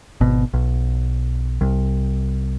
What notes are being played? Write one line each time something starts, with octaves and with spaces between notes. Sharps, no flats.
G#1 B2
B1
C2